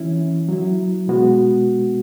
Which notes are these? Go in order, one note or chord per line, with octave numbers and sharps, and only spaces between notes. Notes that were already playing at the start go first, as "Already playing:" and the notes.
Already playing: E3 C#4 E4
F#3 E4
B2 G#3 B3 F#4